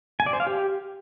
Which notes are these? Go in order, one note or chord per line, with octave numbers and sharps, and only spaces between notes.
G#5
D5
C5
F5
G4